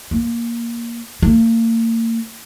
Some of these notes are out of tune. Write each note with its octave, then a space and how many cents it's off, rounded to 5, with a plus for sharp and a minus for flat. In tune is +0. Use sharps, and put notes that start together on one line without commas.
A#3 +5
A#3 -35